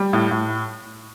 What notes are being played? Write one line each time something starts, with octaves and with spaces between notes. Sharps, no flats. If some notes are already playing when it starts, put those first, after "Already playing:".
Already playing: G3
A2
A2